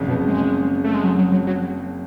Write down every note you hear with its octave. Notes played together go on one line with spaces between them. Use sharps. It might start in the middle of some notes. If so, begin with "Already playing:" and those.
Already playing: F#1 F2 C#3
B2
G#3
A3
G#3
F#3
F#3
F#3
F#3